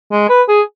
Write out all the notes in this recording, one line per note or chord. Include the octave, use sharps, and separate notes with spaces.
G#3
B4
G#4